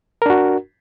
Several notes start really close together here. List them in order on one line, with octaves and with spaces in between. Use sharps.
A#4 D4 F#4